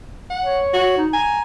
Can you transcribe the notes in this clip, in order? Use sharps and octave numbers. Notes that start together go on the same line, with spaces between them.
F#5
C#5
F#4
D#4
G#5 A#5